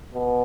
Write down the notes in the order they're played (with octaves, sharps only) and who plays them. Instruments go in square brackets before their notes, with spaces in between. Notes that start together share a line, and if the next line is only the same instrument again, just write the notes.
[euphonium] B2